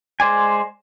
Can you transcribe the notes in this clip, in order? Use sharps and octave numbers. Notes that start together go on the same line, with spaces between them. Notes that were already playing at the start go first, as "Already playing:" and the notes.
G#3 C5 D5 G#5